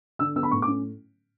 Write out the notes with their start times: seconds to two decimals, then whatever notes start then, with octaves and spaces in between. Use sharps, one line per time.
0.19 D3 E6
0.36 B3 E6
0.43 B5
0.51 A2 C#6
0.62 D6
0.68 C#4